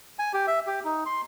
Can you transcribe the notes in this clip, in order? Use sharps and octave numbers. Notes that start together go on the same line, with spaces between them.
G#5
G4
E5
G4
D#4
C6